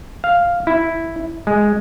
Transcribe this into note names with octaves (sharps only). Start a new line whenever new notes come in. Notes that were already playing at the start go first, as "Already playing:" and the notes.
F5
E4
G#3